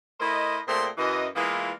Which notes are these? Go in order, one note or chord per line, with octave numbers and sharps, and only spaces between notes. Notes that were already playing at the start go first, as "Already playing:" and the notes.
A3 E4 A#4 C5 D#5
A#2 A3 C4 G#4 G5 C6
F#2 E3 D#5
E3 G#3 A#3 B3 E4 F4